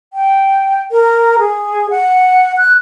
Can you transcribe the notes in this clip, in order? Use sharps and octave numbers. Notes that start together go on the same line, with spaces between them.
G5
A#4
G#4
F#5
F#6